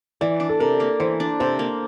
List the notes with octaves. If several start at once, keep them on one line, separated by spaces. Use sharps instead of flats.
E3 D5
D4
A4
C3 A#4
A#3
E3 C5
D4
C3 C5
A#3